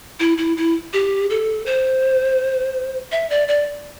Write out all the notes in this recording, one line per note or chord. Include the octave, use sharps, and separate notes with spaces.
E4
E4
E4
G4
A4
C5
E5
D5
D5